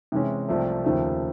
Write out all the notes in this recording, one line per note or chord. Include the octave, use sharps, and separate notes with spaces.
C3 E3 G#3 C#4
C2 C3 F3 A3
D#2 C#3 F3 A3